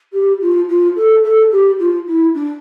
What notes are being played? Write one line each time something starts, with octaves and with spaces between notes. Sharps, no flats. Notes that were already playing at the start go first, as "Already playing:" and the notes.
G4
F4
F4
A4
A4
G4
F4
E4
D4